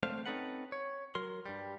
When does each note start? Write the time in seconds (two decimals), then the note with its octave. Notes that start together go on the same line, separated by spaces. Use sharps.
0.03 A3 C4 D4 C5 F5
0.26 C4 C#4 D#4 A4 B4 F#5
0.72 C#5
1.15 F#3 A#4 C6
1.46 G2 G3